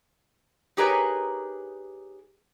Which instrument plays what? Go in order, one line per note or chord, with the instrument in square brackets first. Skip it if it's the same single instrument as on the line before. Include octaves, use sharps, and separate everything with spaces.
[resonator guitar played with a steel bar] D#4 G4 G#4 A#4 B4 C#5